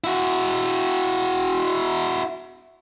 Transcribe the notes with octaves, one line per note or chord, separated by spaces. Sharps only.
E4 F#4